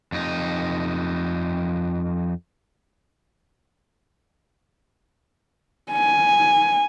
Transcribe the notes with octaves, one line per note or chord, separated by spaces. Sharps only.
F2 D#4
G#5